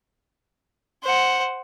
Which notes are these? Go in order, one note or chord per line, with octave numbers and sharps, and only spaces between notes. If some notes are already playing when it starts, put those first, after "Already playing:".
C5 F#5